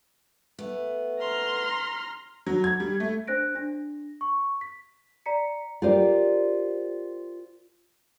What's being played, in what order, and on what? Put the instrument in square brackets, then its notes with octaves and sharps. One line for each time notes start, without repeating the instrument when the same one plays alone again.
[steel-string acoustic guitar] A3 B3
[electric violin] A#5 F6 [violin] C6
[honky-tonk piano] F#3
G#6
G3
A3
[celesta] D4 C5 F#6 A#6 D7
D4 A#6
C#6
B6
D5 A#5 B6 C#7
[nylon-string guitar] F4 G4 A#4 C5 D5